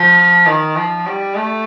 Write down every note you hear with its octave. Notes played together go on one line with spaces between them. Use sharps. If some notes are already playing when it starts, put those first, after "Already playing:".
Already playing: F3
D#3
F3
G3
A3